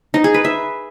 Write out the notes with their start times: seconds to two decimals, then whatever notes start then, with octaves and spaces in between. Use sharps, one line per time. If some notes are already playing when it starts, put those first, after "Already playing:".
0.14 D#4
0.24 G#4
0.34 B4
0.45 E5